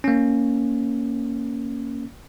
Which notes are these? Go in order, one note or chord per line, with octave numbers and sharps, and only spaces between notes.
A#3 C#4